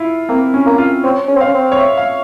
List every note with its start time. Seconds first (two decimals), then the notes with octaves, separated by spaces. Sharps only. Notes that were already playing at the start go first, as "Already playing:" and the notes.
Already playing: E4 F4
0.29 A#3 C4
0.54 C#4
0.66 A#3
0.78 F4
1.04 C4 C#5
1.28 C#4
1.36 C4
1.41 C#4 F5
1.54 C4
1.72 C#5
1.79 E5
1.97 F5